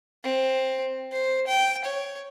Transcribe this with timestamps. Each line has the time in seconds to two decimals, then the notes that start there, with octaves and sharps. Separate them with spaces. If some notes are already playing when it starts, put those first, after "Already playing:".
0.24 C4
1.12 C5
1.47 G5
1.84 C#5